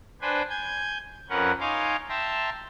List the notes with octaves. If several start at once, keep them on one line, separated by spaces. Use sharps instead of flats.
D4 B4 C5 G5 G#5
G#5 G6 G#6
F2 C#4 A#4 B4 F#5
D#4 C#5 F5 G#5 C6 D6
E5 G5 A5 A#5 C6